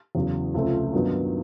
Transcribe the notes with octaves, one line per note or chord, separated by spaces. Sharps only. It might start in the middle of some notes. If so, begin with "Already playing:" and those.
E2 C#3 F#3
C#2 C3 F3 A3 C4
G2 D#3 F#3 B3 D#4